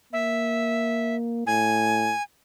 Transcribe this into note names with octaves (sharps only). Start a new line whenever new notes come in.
A#3 E5
A2 G#5